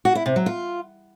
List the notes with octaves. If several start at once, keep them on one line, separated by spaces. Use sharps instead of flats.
F#4
E4
C3
F#3
F4